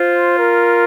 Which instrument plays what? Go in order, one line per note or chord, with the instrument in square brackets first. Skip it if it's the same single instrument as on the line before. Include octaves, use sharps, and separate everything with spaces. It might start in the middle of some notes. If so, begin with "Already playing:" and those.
Already playing: [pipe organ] F4 [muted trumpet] C5
[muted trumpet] A#4